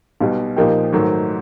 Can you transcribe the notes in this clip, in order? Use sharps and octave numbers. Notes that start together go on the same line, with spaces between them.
B1 B2 G3
A#2 F3 A#3 D#4 G4
G#2 D#3 F#3 A3